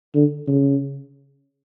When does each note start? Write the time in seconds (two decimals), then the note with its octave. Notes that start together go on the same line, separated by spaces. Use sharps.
0.15 D3
0.47 C#3